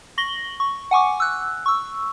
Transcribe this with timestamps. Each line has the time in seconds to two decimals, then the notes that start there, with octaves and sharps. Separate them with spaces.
0.18 C#6 A#6 F#7 G7
0.60 C#6
0.91 F#5 G#5 C#6 D6
1.20 E6 F#6
1.66 C#6 E6